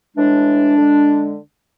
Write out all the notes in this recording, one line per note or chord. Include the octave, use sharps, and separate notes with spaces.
A2 E3 G#3 D4
D3 G#3